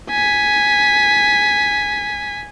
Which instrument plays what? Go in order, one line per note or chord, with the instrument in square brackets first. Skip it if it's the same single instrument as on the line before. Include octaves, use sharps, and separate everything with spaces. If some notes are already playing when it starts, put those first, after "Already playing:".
[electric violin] G#5 B6